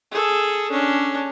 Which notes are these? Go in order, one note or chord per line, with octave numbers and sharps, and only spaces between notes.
G#4 A4
C#4 D4